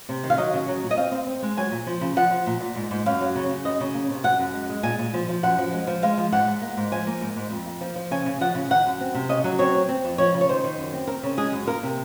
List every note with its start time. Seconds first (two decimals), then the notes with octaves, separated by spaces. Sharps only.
0.09 C3
0.23 D#3
0.30 F5
0.37 F#3 D#5
0.53 C#3
0.68 F#3
0.82 A#2
0.91 D#5
0.97 C4 F5
1.12 C4
1.26 C4
1.43 G#3
1.57 F#3 G#5
1.71 A#2
1.87 F3
2.01 C#3
2.16 F3 F#5
2.30 F3
2.46 A#2
2.60 A#2
2.75 G#2
2.91 G#2
3.06 F#2 F5
3.21 F#3
3.35 C#3
3.49 C#3
3.65 F#2 D#5
3.80 C#3
3.94 A#3
4.10 C3
4.24 F#2 F#5
4.39 F#2
4.53 G#3
4.69 G#3
4.83 A#2 G#5
4.99 A#2
5.14 F3
5.29 F3
5.43 F#2 F#5
5.58 F3
5.73 G#3
5.87 F3
6.03 G#3 F5
6.18 F3
6.32 G#2 F#5
6.47 G#2
6.62 A#3
6.77 G#2
6.92 F3 G#5
7.07 A#3
7.21 G#2
7.36 G#2
7.51 F2
7.66 A#3
7.81 F3
7.95 F3
8.11 C#3 G#5
8.26 C#3
8.41 F3 F#5
8.55 C#3
8.70 D#3 F#5
8.86 F#2
9.01 C4
9.14 C3
9.29 C#3 D#5
9.44 F#3
9.59 C4 C#5
9.75 C4
9.89 C4
10.04 F2
10.18 F3 C#5
10.34 C#3
10.41 C#5
10.49 D#3 C5
10.64 D#3
10.78 F#2
10.93 C4
11.07 C4 A#4
11.23 C#3
11.37 G#3 G#4
11.52 F#2
11.67 A#3 A#4
11.83 C3